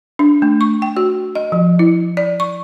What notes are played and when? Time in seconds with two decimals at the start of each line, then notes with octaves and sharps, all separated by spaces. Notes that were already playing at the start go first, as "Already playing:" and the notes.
0.19 D4
0.42 A3
0.61 C#6
0.82 G5
0.97 F#4
1.35 D#5
1.52 F3
1.79 E4
2.17 D5
2.40 C#6